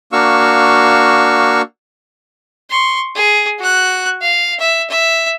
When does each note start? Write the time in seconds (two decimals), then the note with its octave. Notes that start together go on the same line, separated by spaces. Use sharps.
0.12 A#3 D4 F#4 F5 C#6 E6
2.70 C6 C#6
3.15 G#4
3.59 F#4 F#6
4.21 F5
4.60 E5
4.90 E5